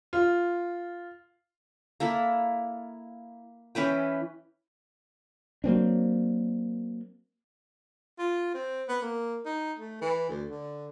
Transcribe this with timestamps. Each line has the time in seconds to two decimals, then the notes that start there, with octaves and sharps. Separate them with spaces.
0.13 F4
2.00 A#3 E4 A4 B5
3.75 E3 C#4 B4 G5
5.64 F#3 A#3 C4 D4
8.19 F4
8.54 C4
8.89 B3
9.02 A#3
9.46 D#4
9.78 A3
10.02 E3
10.29 D2
10.51 D3